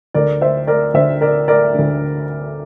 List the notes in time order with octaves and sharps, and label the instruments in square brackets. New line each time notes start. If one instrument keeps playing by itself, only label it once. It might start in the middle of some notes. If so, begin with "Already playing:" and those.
[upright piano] D2 D3 A#4 D5
C5 E5
A#4 D5
D2 D3 C5 E5
A#4 D5
A#4 D5
D2 D3